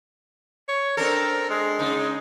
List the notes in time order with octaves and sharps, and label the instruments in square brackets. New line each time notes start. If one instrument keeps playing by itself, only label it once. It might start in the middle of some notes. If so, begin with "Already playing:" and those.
[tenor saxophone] C#5
[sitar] C4 D4 A4 [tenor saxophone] A#4
[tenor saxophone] G#3
[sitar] C#3 D#4